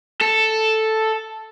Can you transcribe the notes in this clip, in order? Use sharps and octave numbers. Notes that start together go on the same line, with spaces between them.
A4